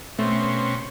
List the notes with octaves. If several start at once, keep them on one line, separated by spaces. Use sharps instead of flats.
B2 A3 C4 C#4